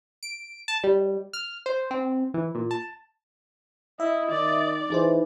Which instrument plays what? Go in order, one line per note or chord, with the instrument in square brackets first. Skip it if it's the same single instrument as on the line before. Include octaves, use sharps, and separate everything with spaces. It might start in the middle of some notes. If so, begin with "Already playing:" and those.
[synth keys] D7
A5
G3
F6
C5
C4
E3
A#2
A5
[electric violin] E4 [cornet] D#5 [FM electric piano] E5
[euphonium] D#3 [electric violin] D5
[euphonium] E3 [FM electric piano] D#4 G#4 C5